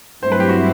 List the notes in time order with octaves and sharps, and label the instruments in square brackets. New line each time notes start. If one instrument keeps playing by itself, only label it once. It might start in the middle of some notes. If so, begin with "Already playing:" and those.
[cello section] G2 F#3 A3 C4 E4 [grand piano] C5
[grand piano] B4
G4
F#4